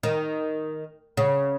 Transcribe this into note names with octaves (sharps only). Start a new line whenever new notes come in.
D#3
C#3